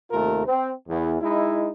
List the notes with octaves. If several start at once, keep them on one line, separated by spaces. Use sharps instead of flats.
D#2 C3 A3 F4 A#4
C4
E2
G#3 D#4 E4